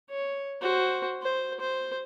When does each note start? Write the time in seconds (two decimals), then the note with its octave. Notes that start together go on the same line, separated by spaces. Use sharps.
0.10 C#5
0.61 F#4 C5
1.22 C5
1.60 C5